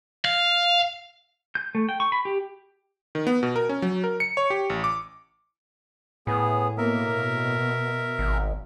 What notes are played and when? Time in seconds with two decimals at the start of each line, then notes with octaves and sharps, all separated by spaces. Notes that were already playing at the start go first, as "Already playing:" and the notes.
0.25 F5
1.55 G6
1.75 A3
1.89 G5
2.00 C#6
2.12 B5
2.25 G4
3.15 D#3
3.27 B3
3.43 B2
3.56 A#4
3.69 C#4
3.82 F#3
4.04 A#4
4.20 C#7
4.37 C#5
4.50 G4
4.70 A1
4.84 D6
6.27 A2 B3 G#4
6.78 B2 A#3 A#4 E5
7.16 B2
8.19 G#1